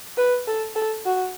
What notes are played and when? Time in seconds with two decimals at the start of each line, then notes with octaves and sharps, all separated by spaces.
0.17 B4
0.47 A4
0.76 A4
1.05 F#4